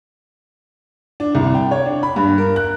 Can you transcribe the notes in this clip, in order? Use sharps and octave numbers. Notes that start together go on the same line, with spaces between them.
D4
C2
G5
C#5
D4
B5
G2
A#4
F#6